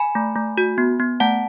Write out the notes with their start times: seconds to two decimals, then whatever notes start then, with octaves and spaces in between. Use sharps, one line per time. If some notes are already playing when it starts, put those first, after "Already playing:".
Already playing: G#5 B5
0.15 A3
0.36 A3
0.58 F#4
0.78 B3
1.00 B3
1.20 A3 F#5 A5